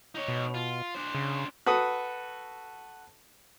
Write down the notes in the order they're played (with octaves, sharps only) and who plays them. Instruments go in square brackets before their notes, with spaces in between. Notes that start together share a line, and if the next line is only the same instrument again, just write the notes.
[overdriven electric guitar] D#4 C#5
[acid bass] B2
[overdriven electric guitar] F4
D4 C5
[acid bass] C#3
[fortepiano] F#4 A4 B4 D#6